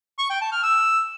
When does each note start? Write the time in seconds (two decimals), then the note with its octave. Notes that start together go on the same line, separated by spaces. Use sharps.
0.19 C#6
0.30 G5
0.41 A5
0.52 F6
0.63 E6